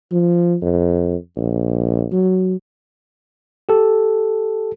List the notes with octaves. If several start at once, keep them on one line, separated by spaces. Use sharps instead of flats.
F3
F2
A#1
F#3
G4 A4